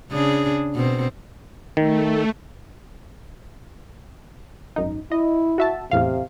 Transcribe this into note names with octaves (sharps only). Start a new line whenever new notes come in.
C#3 D4 G#4
B2 C4
D#3 A3
G#1 F#2 D#4
E4 D#5
F#4 E5 A5
E2 A2 C3 F5